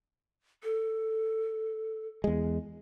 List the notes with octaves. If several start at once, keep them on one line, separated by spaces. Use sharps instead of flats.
A4
E2 G#3